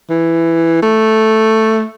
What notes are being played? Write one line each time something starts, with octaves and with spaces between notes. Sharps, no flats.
E3
A3